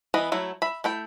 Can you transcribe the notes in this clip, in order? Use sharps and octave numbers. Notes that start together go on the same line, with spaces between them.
E3 B3 B4 D#5
F#3 A3 E4
E5 B5
A3 E4 G5